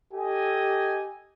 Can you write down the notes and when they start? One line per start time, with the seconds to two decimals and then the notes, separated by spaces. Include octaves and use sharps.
0.14 G4 A4 D#5 G#5